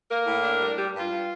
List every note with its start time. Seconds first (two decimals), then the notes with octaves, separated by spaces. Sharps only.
0.10 A#3 A#4
0.26 A2
0.43 D4
0.60 G3
0.76 G3 G4
0.94 G2
0.99 F4
1.10 G2